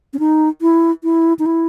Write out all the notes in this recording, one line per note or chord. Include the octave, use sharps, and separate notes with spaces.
C#4
D#4
E4
E4
D#4
E4